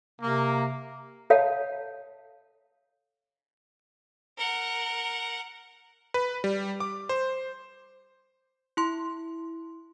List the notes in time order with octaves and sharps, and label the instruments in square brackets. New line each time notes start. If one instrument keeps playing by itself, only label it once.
[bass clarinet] C3 [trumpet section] A#3
[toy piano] A4 C#5 F5 F#5 A5
[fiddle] A#4 F#5
[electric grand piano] B4
G3
D6
C5
[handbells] E4 C6